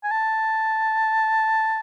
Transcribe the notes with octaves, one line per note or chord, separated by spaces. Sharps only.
G#5
A5